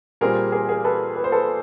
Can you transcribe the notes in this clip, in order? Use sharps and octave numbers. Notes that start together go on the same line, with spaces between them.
A#2 G3 C4 G#4 A#4
G#4 A#4
G#4 A#4
A4 B4
B4
C5
A4 B4